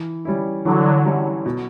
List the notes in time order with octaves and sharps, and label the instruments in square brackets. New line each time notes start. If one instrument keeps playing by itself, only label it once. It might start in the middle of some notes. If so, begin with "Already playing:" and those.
Already playing: [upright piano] E3
G3 C#4 E4
[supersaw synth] D3 F#3 [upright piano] E3
[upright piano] G3 C#4 E4
B2